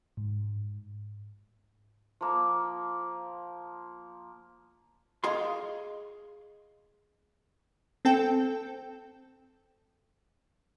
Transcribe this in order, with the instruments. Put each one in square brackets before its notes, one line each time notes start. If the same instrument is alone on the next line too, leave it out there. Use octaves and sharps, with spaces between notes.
[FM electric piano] G#2
[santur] F3 A#3
[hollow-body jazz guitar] G#4 D#5 F5 C6
[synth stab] C4 A4 G5